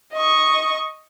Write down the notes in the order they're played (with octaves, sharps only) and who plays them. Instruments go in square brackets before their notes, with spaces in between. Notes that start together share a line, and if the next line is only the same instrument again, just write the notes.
[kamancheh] D#5 C#6